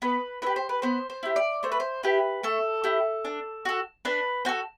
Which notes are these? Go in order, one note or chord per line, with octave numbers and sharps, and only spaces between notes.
B3 B4
E4 G4 B4
C5
B4
B3 C5
C5
E4 G4
D5
A3 C5
B4
C5
E4 G4 B4
A3 A4
E4 G4
D4
F#4 A4
D4 B4
F#4 A4 C5